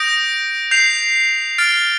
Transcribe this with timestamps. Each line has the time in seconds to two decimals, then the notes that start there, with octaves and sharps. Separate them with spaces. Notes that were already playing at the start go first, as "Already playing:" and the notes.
Already playing: D#6 G6 A#6 D7
0.71 G6 C7 F7
1.58 F6 A6 D7